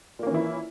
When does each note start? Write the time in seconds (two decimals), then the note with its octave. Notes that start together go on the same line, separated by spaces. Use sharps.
0.19 A#2
0.23 A#3
0.27 C#4
0.31 E3
0.34 E4